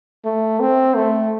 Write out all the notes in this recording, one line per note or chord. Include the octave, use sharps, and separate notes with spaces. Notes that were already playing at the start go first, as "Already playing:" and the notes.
A3
C4
A3